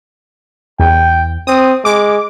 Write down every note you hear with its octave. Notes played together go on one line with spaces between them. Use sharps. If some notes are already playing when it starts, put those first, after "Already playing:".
E2 G5
C4 D#6
G#3 D6